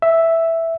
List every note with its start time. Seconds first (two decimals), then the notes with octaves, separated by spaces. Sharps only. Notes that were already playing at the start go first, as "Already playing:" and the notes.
0.02 E5